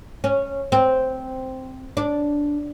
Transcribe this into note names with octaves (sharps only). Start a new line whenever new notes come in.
C#4
C4
D4